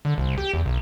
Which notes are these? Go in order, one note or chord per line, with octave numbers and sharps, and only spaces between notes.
D3
C2
G4
E2
B1